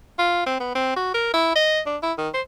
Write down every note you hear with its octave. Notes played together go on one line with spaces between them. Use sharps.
F4
C4
B3
C4
F#4
A#4
E4
D#5
D4
E4
D#3
C5